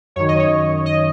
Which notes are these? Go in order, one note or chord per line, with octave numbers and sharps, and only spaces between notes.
F#2 D#3 C#5
D#5
C#5
D#5